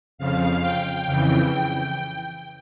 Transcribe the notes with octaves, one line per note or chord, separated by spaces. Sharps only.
F2 C#3 F3 F5
G5
F2 C#3 E3 G5
G5